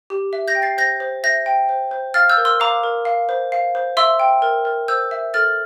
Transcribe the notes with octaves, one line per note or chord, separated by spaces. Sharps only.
G4
E5
G6 A#6
G5
A6 C7
C5 G6 A#6
C5
E5 G6 A#6
G5
C5
C5
F5 F6 A6
E6 G6
A#4
C6 E6
F5 A#5 D6
A#4
F5
C5
F5
C5
E5 C6 E6
G5
A#4
A#4
C5 E6 G6
E5
A4 F6 A6